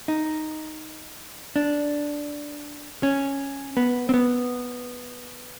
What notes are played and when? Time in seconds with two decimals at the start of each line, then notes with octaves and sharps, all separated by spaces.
0.08 D#4
1.56 D4
3.03 C#4
3.77 B3
4.09 C4
4.14 B3